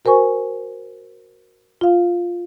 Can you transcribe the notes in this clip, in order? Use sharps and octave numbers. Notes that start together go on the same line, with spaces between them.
F#4 A#4 C5 G#5 C#6
F4 F5